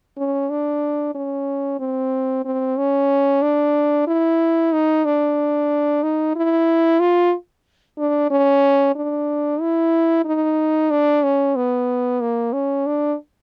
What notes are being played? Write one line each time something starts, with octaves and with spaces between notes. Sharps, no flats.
C#4
D4
C#4
C4
C4
C#4
D4
E4
D#4
D4
D#4
E4
F4
D4
C#4
D4
E4
D#4
D4
C#4
B3
A#3
C#4
D4